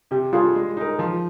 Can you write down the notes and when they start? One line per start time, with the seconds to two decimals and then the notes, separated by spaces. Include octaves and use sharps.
0.11 C3 G4
0.33 G3 D4 F4 G#4
0.55 G#3
0.77 D#4 A#4
0.99 F3